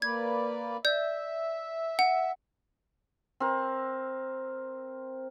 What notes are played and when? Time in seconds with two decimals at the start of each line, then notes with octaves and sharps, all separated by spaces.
0.02 A#3 B4 D5 G#6
0.85 D5 E5 G6
1.99 F#5
3.40 C4 A#4